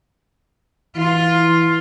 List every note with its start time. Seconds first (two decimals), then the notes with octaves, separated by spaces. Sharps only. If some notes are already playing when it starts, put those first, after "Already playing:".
0.96 E3 F4